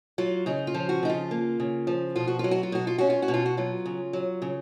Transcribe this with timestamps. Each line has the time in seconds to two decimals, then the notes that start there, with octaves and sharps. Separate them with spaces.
0.18 F#3 F4
0.46 C#3 D#4
0.67 F4
0.75 F3
0.89 F#4
1.03 C#3 D#4
1.09 F4
1.31 A#3
1.60 C#3
1.87 F3
2.16 B2 F4
2.27 F#4
2.39 F#3 F4
2.51 F#4
2.63 F4
2.72 B2 F#4
2.87 F4
2.98 C#4 F#4
3.10 F4
3.22 F#4
3.28 B2
3.34 F4
3.46 F#4
3.57 F#3 F4
3.86 C#3
4.13 F#3
4.42 C#3